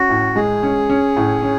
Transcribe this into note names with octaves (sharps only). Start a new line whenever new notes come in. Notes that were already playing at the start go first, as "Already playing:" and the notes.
Already playing: C#4 F#4
A2
G#3 G#4
C#4
C#4
A2
C#4